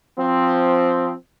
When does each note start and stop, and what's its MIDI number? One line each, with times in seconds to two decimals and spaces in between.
0.18 1.14 53
0.18 1.14 60